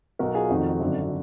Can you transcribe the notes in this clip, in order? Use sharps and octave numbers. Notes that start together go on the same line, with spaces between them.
B1 B2 F#4 A#4
F4 G#4
F1 F2 D#3 D#4 F#4
G#1 F#2 D3